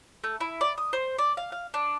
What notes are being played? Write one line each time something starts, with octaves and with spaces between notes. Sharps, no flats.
A3
E4
D5
D#6
C5
D5
F5
F5
D4